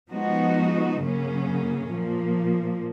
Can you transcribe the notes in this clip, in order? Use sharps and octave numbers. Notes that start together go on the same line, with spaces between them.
F3 G#3 B3 D#4 F#4
F#2 C#3 F#3 A#3 C#4
A#2 F3 A#3